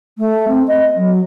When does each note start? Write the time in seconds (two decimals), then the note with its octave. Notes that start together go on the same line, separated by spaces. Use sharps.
0.18 A3
0.48 C4
0.67 D#5
0.96 F#3